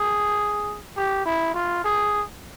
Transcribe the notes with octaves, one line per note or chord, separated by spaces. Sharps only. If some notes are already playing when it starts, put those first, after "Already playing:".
Already playing: G#4
G4
E4
F4
G#4